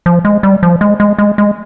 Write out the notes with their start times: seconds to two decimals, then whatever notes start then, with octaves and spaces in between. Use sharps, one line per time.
0.06 F3
0.25 G#3
0.43 G3
0.63 F3
0.81 G#3
1.00 G#3
1.18 G#3
1.38 G#3